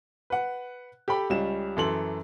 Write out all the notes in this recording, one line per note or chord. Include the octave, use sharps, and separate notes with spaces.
B4 F#5
G4 A4 G5 B5
C#2 G3 C#4 E7
F#2 E3 A4 C6 F#7